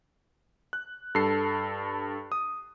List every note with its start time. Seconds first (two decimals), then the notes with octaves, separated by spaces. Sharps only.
0.73 F#6
1.15 G2 A4 C7
2.32 D#6